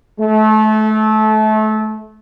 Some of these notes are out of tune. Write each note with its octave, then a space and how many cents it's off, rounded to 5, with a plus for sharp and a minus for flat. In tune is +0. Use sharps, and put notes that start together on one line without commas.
A3 -25